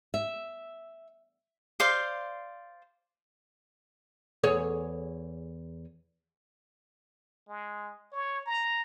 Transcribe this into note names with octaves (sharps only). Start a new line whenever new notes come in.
E5
C5 D5 F5 C6
E2 G#4 C#5
G#3
C#5
A#5